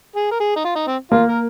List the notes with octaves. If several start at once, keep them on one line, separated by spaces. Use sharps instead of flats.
G#4
A#4
G#4
D#4
F4
D#4
C4
A#3 F4
A#4